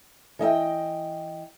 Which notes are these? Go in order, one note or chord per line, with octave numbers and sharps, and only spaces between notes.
E3 D#5 E5 G5